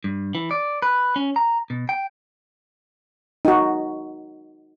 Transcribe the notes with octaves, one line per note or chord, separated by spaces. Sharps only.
G2
E3
D5
B4
C#4
A#5
B2
G5
D#4 F#4